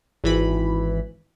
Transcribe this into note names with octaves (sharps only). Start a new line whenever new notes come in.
G#1 E3 B5